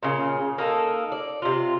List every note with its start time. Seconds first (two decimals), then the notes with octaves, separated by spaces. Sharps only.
0.03 A#2 C#3
0.58 A#3 D#4 A4
1.12 D5
1.42 C3 F4